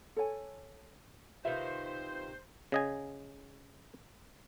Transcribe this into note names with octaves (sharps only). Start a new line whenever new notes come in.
A4 C#5 G#5
C3 D#3 F4 B4 C5 E5 F5
C#3 D#5 G#5